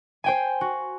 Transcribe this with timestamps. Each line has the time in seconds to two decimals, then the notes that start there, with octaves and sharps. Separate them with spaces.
0.24 C5 G5 G#5
0.61 F#4